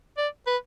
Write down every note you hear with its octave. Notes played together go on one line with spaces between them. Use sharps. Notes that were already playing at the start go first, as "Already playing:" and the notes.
D5
B4